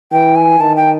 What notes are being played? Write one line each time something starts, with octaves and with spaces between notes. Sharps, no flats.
E3 G5
G#5
D#3 A5
G5